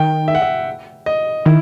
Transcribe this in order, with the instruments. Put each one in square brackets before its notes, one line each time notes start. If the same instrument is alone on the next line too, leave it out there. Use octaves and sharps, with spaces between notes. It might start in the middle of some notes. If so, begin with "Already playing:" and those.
Already playing: [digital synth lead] D#3 [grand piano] G5
[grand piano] E5
F#5
E5
D#5
[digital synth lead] D#3 [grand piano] E4